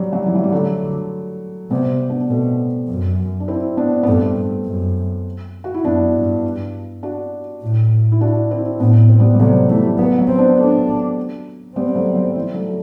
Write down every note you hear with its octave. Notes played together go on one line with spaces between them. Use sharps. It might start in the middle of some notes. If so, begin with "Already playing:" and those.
Already playing: F#3 G3
F#3
E3
F#3
G3
D3 F#3 A3
C3 G3 B3
B3 D4
B2 A3 C4
F#2
D4
C4 E4
B3 D4
B3
G2 A3 C4
G2
F#2
F#4
E4
F#2 B3 D4
G2
D4 F#4
A2
E4
D4 F#4
C4 E4
A2 B3 D4
C4
G3 B3
G3
C3 F#3 A3
E3 G3 A3
F#3 B3
F#3
C4
B3 D4
A3 C4 D4
G3 B3 C4
B3
F#3 A3
F#3
E3 G3
F#3 A3
A3